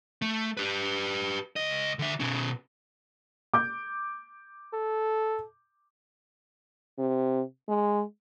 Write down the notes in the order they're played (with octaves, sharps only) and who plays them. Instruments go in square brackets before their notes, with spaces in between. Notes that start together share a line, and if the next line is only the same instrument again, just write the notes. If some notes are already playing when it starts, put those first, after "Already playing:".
[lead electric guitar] A3
G4 B4
C#2 D#5
D3 E5
B2 C#4
[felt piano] D6 G6
[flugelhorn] A4
[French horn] C3
G#3